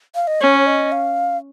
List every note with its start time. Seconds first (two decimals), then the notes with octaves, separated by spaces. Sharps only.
0.15 F5
0.27 D#5
0.41 C#4 C#5
0.66 D#5
0.92 F5